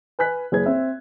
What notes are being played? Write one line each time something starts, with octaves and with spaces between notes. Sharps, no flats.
B4 G#5 F#6 B6
F#1 G#4 B4 G#6
C4 E5